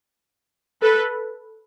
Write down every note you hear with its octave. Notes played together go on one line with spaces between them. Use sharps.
A4 B4